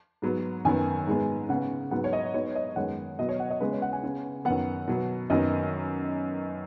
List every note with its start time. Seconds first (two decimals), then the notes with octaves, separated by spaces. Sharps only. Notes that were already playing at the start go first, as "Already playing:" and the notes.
0.22 G#2 F#3 B3
0.65 F#2 D#3 B3 G#5
1.07 G#2 G#3 B3
1.49 C#3 B3 F#5
1.91 G#2 F#3 B3 F#5
2.04 C#5
2.13 D#5
2.34 G#2 F#3 B3 C#5
2.55 D#5
2.76 F#2 D#3 G#3 B3 F#5
3.19 B2 F#3 B3 D#5
3.29 C#5
3.40 F#5
3.50 D#5
3.61 C#3 G#3 B3 B4
3.71 C#5
3.82 F#5
3.93 G#5
4.03 C#3 B3
4.45 F#2 D#3 B3 F#5
4.88 B2 F#3 B3
5.30 F#2 D#3 B3 D#5